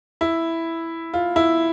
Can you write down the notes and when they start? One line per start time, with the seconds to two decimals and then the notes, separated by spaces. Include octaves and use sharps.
0.21 E4
1.14 F4
1.36 E4